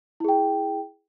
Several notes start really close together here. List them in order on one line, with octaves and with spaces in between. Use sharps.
E4 G#4 G5